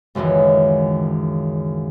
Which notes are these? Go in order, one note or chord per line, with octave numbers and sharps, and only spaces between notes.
F#1 C#2 F#2 D#3 E3